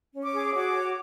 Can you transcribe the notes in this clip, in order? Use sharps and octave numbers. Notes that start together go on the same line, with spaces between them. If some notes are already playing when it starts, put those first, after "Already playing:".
C#4
D6
G#4
F#4 D6
C#5